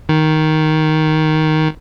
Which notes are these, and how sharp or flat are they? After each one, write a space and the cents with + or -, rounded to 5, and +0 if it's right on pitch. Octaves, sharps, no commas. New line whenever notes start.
D#3 +5